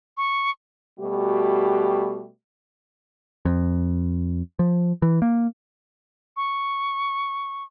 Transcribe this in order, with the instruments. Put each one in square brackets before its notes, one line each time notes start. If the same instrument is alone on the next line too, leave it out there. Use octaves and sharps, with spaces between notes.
[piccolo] C#6
[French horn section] B2 G3 A3 F#4 G4
[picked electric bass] F2
F3
E3
A#3
[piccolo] C#6